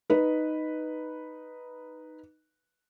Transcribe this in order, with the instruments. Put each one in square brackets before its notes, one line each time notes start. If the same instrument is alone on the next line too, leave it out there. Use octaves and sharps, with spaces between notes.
[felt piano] D#4 B4